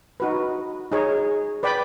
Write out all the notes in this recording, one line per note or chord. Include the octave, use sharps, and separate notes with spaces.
D#4 F#4 B4
D#4 G#4 C#5
B4 D5 G5 B5